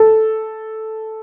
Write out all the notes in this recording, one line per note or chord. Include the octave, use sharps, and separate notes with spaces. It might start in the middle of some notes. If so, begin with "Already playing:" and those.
Already playing: A4